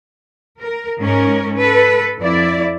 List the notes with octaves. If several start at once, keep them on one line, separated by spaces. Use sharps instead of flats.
A#4
G#2 C#4 A#4
A4 B4
F2 E4 D5